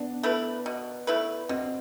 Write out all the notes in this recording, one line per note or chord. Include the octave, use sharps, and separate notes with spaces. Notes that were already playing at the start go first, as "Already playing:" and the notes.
Already playing: B3 D4
A3 E4 B4
B2
A3 E4 B4
B2 C4